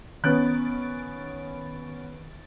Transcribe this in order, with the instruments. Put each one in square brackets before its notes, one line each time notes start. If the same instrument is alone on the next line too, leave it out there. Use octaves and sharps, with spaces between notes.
[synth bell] D#3 A6 D7 [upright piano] B3 C#4 F#6